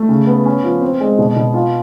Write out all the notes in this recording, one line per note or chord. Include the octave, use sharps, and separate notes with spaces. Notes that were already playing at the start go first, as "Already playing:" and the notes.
Already playing: A3
C#3
B3
C#4
F3
C4
G#3
B2
B2
F4